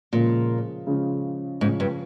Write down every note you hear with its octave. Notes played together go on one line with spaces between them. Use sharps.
A#2 C#3 F3 G#3 C#4
C#3 F3 G#3 C#4
G#2 C#3 F3 G#3 C#4
G2